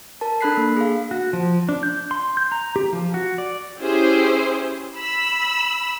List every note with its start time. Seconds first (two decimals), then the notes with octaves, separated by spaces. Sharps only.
0.21 A#4 A5
0.41 D4 A4 B5 F#6 B6 C7
0.57 A#3
0.77 G#4 F5
1.11 F#4
1.33 F3
1.69 D4
1.83 G6
2.11 C6
2.37 G6
2.52 A#5
2.76 G4
2.93 F3
3.14 F#4
3.38 D5
3.80 C#4 E4 G4 G#4 C5
4.97 B5 E6